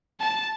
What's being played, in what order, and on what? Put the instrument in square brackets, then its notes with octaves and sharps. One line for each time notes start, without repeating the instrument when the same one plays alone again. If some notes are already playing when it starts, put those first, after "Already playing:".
[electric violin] A5